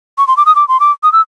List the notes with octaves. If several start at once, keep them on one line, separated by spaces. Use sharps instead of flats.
C#6
C6
D6
D#6
D6
C6
D6
D#6
E6